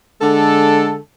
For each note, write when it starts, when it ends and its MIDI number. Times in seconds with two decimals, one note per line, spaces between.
0.22 0.99 50
0.22 0.99 56
0.22 0.99 69